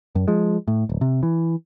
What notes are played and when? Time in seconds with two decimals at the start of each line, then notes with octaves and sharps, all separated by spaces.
0.15 F#2
0.28 F3 G#3
0.68 A2
0.89 D1
1.01 C3
1.23 E3